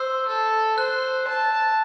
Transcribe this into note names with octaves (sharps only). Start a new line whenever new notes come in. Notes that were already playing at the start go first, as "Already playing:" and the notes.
Already playing: C5 E6
A4
C5 F#6
A5